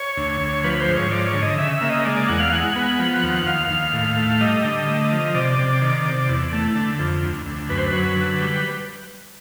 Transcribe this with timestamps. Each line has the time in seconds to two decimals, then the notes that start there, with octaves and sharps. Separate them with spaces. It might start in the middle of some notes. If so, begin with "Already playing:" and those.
Already playing: C#5
0.17 D2
0.41 D2
0.64 F3 B4
0.80 C5
0.88 G#2
0.96 C#5
1.11 F3 D5
1.27 C#5
1.34 D3
1.42 D#5
1.58 C#3 E5
1.73 E5
1.81 A#3
1.89 D#5
2.05 G#3 D5
2.17 D5
2.28 E2 F#5
2.40 F5
2.52 G#3 F#5
2.76 B3
2.99 F3
3.23 D#2
3.35 F#5
3.46 D#2 F5
3.70 D#2
3.93 A2
4.17 A3
4.41 G3 D#5
4.64 D3
4.87 A3
5.12 F3
5.34 C3 D5
5.59 C3
5.81 D#3
6.05 C3
6.29 E2
6.53 A3
6.76 D3
6.99 F2
7.23 D2
7.46 D2
7.69 F#2 B4
7.78 C5
7.86 B4
7.93 F#3
8.16 D3
8.41 G3